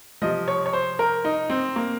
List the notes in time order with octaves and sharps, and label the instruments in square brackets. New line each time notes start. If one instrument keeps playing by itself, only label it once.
[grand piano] C3 F3 D#5
C#5
C#5
C5
A#4
D#4
C4
A#3